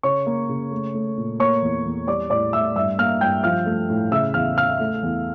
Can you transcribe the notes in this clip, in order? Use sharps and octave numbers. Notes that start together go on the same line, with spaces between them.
C#3 C#5 C#6
A#3
C#3
A3
A3
A#2
A#3 C#5 C#6
E2
E2
G3 D5 D6
A2 D5 D6
A2 E5 E6
G2 E5 E6
A#3 F5 F6
G2 G5 G6
F3 F5 F6
A3
A2
C#3 E5 E6
E2 F5 F6
C#3 F5 F6
A3
E2